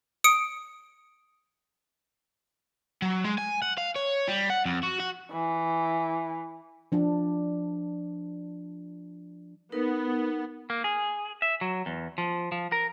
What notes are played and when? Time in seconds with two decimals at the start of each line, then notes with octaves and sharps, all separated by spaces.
0.24 D#6 C#7 D7
3.02 F#3
3.24 G#3
3.38 G#5
3.62 F#5
3.78 F5
3.96 C#5
4.28 G3
4.50 F#5
4.65 F2
4.83 F#4
5.00 F#4
5.32 E3
6.92 F3 D4
9.72 B3 D#4 A#4 B4
10.70 A#3
10.84 G#4
11.42 E5
11.61 F#3
11.86 E2
12.18 F3
12.52 F3
12.72 A#4